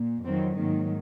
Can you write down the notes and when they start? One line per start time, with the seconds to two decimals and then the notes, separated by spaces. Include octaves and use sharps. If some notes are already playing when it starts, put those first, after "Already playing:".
Already playing: A#2
0.25 F2 D#3 F#3 C4
0.57 G#2 D#3 F#3 A#3